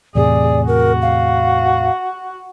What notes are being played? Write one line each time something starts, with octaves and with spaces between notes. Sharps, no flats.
E2 A2 C3 G#4 D5
F#4 A#4
F5